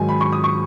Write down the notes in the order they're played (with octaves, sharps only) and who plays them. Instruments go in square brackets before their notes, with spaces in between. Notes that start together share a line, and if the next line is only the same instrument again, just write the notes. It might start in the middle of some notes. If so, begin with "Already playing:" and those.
Already playing: [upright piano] G#2 D#3 F#3 G#5
B5
C#6
D#6
C#6